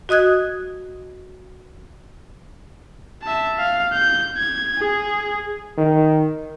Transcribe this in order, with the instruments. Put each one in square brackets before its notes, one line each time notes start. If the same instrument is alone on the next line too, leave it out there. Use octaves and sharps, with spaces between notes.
[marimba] F#4 D#5 D#6 F#6 G#6
[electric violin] E5 A5
F5
G6
G#6
G#4
[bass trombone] D#3